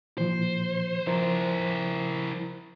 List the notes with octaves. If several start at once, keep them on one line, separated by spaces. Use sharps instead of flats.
A#2 E3 F3 C5
F3 E4 A#4 C5